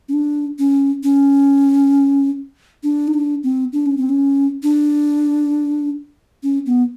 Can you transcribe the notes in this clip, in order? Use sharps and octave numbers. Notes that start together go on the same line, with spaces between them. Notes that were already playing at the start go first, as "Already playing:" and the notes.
C#4
D4
C#4
C#4
D4
D#4
D4
C4
D4
C#4
C4
C#4
D4
C#4
B3